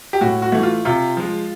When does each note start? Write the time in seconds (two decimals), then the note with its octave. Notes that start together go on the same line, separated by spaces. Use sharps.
0.13 G4
0.21 A2 F#4
0.42 F#4
0.52 E3 A3
0.63 F4
0.85 C3 F4
1.17 F3 G#3